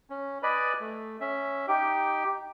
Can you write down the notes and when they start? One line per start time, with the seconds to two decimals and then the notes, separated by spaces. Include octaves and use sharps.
0.10 C#4
0.43 B4 D5 D#5 G#5 B5
0.81 A3
1.21 C#4 E5
1.68 D#4 G4 G5